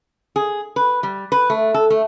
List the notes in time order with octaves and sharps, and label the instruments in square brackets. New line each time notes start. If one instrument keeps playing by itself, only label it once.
[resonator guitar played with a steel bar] G#4
B4
G3
B4
A3
A4
A3